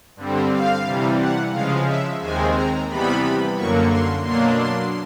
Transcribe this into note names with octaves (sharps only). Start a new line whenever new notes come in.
G2 D3 G3 C4
F5
C3 E3 G3
F#5
C#3 F3 G#3 F5
E5
D#2 D#3 G#3 C4 G#5
A#5
C3 E3 G3 B3 B5
F#2 D3 F#3 A#3 C#6
C6
B2 F#3 A#3 D4 C6
C6